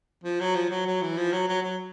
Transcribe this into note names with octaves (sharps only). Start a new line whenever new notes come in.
F3
F#3
F3
F#3
F#3
E3
F3
F#3
F#3
F#3